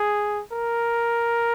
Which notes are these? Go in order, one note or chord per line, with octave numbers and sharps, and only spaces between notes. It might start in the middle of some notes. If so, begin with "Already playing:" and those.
Already playing: G#4
A#4